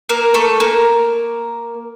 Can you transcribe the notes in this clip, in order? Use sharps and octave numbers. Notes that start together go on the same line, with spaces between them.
A#3 A#4
A3 A4
A#3 A#4